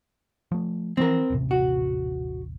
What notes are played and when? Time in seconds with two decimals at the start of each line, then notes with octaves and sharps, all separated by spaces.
0.52 F3 A3
0.97 E3 F3 C4 A#4
1.30 D#1 A1 C3
1.51 F#4